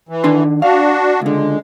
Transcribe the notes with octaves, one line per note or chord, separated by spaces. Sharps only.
E3
D#3 D4 C6
D4 F#4 F5
C#2 D3 G#3